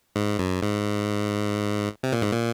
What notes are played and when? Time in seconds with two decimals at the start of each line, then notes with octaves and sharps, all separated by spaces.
0.16 G#2
0.39 F#2
0.63 G#2
2.03 C3
2.13 A#2
2.22 G#2
2.33 A#2